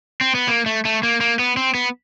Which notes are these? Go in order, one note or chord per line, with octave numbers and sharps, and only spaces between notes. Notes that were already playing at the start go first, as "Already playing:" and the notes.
C4
B3
A#3
A3
A3
A#3
A#3
B3
C4
B3